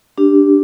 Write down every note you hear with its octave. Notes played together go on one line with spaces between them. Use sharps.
D4 G4